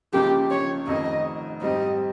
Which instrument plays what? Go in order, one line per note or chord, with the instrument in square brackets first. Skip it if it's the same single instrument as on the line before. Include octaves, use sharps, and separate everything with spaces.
[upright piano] C#2 C#3 F3 A#3 [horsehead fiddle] G4
[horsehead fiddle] C#5
[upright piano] F1 F2 D#3 [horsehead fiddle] D#5
[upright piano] G#2 G3 C4 G4 [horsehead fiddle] D#5